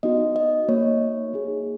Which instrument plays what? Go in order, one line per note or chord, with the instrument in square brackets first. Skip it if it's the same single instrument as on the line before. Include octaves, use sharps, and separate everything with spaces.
[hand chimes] B3 D#4 F#4 D#5
D#5
A#3 D#4 F#4 C#5
A#3 D#4 G#4